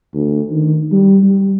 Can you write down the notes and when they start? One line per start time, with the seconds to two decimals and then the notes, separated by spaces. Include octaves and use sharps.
0.14 D2
0.51 D#3
0.92 G3
1.23 G3